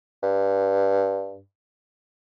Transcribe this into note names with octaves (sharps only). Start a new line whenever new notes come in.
G2